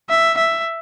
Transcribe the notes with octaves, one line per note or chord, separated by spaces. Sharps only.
E5
E5